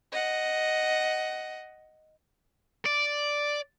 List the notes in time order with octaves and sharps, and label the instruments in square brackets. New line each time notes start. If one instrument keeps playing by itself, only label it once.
[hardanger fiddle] D#5 F#5
[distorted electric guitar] D5